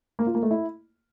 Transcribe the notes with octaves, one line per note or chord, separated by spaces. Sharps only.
A#3
F4
A#3
A3
E4